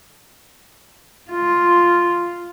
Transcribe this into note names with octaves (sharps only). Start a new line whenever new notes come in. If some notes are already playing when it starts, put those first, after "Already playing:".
F4